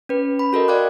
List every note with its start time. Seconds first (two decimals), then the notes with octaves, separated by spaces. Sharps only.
0.09 C#4 B4
0.39 B5
0.53 F#4 A4 A#4 D#5
0.68 D5 F5 G5 D6 F#6